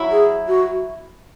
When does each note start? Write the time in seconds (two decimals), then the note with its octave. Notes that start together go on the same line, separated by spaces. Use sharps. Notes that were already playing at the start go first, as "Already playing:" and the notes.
Already playing: F#3 E4
0.11 G#4
0.48 F#4